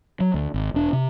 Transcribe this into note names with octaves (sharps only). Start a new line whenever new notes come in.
F#3
D2
G#1
E1 D4
C3